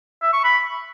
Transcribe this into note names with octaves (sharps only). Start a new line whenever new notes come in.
E5
C#6
B5